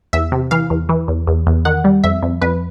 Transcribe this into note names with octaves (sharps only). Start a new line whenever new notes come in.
E2 E5
C3
E3 F5
E2
E3
E2
E2
E2
D#3 F#5
G3
F2 E5
F2
F2 B4